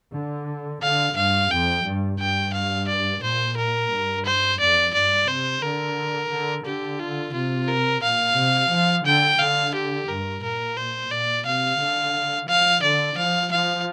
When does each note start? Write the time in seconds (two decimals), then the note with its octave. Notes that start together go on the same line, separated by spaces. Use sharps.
0.13 D3
0.82 D3 F5
1.17 G2 F5
1.51 F2 G5
1.86 G2
2.19 G2 G5
2.54 F5
2.88 D5
3.23 A#2 C5
3.57 A#4
3.91 G2
4.26 C5
4.59 F2 D5
4.94 G2 D5
5.28 C3 C5
5.62 D3 A#4
6.32 D3
6.65 D3 G4
6.99 F4
7.34 C3 F4
7.68 A#4
8.03 A#2 F5
8.36 C3
8.71 F3
9.06 D3 G5
9.39 D3 F5
9.75 G4
10.08 G2 A#4
10.43 A#2 A#4
10.77 C5
11.11 A#2 D5
11.45 C3 F5
11.80 D3
12.48 F3 F5
12.83 D3 D5
13.17 F3 F5
13.51 F3 F5